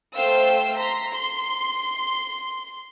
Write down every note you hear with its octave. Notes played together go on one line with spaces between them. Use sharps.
A3 C5 F5 G5 E6
A#5 C6 B6
C6